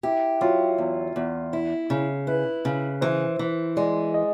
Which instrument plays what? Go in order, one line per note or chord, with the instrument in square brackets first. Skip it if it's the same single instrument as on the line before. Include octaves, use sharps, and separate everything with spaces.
[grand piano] E4 [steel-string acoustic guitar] G4
[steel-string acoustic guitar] F#3 [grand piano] F4
[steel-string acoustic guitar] E2
E2
E4
C#3
[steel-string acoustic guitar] E4 [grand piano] B4
[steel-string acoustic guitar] C#3
[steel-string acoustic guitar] E3 [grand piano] C5
[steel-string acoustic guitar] E3
[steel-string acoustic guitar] G#3 [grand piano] D5
[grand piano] D#5